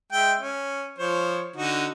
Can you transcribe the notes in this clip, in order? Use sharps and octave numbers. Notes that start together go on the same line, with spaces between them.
G#3 E5 G5
C#4
F3 C5 C#5
D3 D#4 F#4